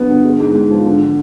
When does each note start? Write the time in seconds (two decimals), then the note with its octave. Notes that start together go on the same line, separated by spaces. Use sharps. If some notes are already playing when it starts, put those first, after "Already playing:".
Already playing: G2 F#3 B3
0.09 D3
0.25 G#3
0.40 G#2
0.54 G#2
0.71 F3
0.85 D3